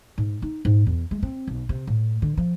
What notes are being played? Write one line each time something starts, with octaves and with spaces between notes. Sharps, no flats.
G#2
D#4
G#2
E2
G#3
C4
B1
C3
A2
D3
F3